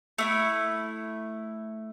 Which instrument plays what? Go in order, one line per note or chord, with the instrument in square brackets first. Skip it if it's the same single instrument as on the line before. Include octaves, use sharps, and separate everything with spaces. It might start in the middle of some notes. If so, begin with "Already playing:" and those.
[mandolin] A3 E4